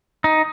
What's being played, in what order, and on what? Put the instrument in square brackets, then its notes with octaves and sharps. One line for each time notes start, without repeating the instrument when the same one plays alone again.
[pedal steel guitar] D#4